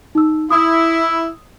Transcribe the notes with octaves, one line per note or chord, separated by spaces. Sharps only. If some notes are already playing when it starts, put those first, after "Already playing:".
D#4 E6
E4 D#6 E6